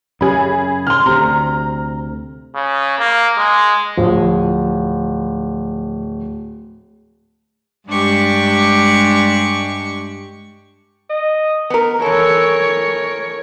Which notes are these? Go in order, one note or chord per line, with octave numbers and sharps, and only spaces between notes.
F#2 C#3 G#4 B5
C6 F6
D2 C3 A#5
C#3
A#3
G#3
D1 F3
G2 G#3 D4 G4 C#6
D#5
B3 A#4
E3 A4 A#4 C#5